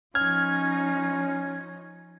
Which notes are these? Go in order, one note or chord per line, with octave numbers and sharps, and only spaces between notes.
F3 C#4 D#4 F6 G#6